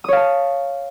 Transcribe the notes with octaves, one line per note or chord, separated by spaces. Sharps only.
C#5 F5 A5 D#6